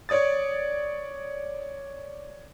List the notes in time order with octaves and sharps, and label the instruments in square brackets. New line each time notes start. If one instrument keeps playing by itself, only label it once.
[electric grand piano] C#5 D5 D#6 A6